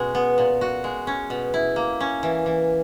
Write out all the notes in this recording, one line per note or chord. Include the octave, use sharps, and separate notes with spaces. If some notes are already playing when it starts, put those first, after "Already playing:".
Already playing: B2 G#3 C#4 F#4
B3
A#2
F#4
G#3
C#4
B2
E4
A#3
C#4
E3
E3